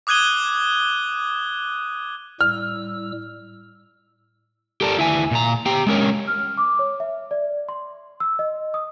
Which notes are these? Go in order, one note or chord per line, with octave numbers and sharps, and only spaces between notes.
D6 D#6 F#6 G#6 D#7 G7
A2 G3 E6 F6
G4 A4 A#4 D5 A5
D2 E4 E5 G#5
A#2 A#5
G4 G5 A#5
G#3 C#4 A#4 C#5
F6
D6
C#5
E5
D5
C6
E6
D#5
D#6